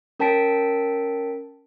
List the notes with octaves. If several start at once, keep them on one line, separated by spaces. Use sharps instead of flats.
C#4 A#4 G5 A5 B6 D7